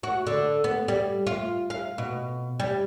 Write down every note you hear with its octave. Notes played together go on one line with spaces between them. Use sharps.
F#4
D3
B3
G3
F4
F5
B2
G3